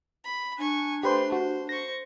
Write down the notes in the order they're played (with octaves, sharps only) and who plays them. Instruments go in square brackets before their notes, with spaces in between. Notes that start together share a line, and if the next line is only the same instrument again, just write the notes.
[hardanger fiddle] B5
[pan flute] D4 [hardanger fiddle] G#5 C#6
[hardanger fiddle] A3 C6 [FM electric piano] G4 B4 C5
[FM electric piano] F#4 [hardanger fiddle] C5
[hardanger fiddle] C5 C#6 [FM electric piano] A#6